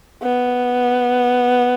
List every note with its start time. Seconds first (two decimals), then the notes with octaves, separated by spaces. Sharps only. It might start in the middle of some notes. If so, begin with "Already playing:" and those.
0.23 B3